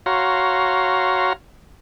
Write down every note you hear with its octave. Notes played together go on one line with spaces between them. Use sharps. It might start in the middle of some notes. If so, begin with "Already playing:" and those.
F#4 C#5 F5 A#5 C6